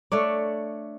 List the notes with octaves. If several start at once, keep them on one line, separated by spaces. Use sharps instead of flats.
A3 D4 C#5 D5